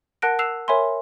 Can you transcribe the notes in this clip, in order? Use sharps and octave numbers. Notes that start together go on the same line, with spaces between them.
A#4 F#5 A5 F#6 A#6 D7
E6 F#6 C7 E7 F7
A#4 C#5 E5 G#5 B5 C6